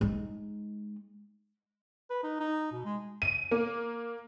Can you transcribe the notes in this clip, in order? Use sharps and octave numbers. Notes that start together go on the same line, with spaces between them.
G#3 D#4
B4
D#4
D#4
B2
G#3
D#7
A#3